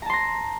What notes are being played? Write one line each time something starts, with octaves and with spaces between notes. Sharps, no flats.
A5 A#5 C6 A#6